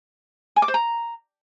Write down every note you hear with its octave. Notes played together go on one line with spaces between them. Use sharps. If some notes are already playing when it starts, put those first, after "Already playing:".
G#5
D6
C5
A#5